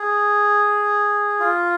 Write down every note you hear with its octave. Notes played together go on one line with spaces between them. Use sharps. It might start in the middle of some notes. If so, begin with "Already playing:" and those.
Already playing: G#4
F4